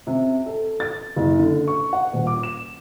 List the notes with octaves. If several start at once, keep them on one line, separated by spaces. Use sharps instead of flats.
C3
A4
A6
F#1
D3
C#6
F#5
D#1
D6
E7